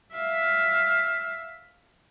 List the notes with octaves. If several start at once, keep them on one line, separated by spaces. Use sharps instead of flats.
E5 F5